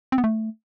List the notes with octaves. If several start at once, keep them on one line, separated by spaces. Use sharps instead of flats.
C4
B3
A3